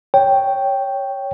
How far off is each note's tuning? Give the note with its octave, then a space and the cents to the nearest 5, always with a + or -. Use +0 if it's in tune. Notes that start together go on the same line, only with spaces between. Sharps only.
C#5 +0 G5 +0